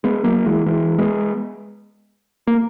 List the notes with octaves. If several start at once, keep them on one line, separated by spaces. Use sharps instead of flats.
G#3 B3
F#3 A#3
E3 G#3
E3 G#3
G#3 B3
A#3